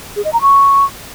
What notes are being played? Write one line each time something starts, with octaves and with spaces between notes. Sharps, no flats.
G#4
D#5
A#5
C#6